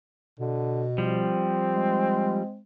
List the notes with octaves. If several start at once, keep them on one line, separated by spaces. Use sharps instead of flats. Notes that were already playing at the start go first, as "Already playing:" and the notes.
B2 D3
F3 G3 C4
G#3